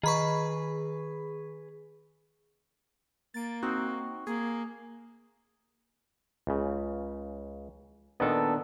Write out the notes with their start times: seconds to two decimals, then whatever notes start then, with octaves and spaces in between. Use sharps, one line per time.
0.03 D#3 G#4 B4 B5 C#6
3.34 A#3 A6 D7
3.62 C4 D#4 F#4
4.27 A#3 G#4
6.47 C#2 C#3
8.20 A#2 D#3 B3 D4 A4 D#5